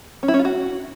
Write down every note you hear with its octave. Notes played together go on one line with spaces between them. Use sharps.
C#4
E4
C#4
F4
F#4